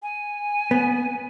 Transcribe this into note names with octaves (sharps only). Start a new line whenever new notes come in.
G#5
B3